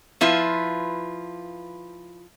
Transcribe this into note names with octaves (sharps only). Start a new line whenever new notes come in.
F3 E4 F4 B4